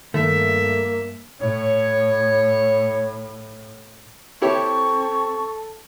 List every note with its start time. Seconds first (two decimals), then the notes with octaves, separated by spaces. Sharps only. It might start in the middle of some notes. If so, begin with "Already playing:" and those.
0.14 G2 D#3 A3 A#3 E5
1.41 A2 C#5
4.42 C4 E4 G4 A4 C#5 C#6